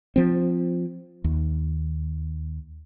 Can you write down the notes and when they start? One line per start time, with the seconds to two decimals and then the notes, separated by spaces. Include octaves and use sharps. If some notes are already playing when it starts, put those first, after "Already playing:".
0.16 F3 C4
1.24 D#2